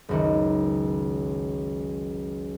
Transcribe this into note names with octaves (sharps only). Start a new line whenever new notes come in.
F#1 C#2 D#3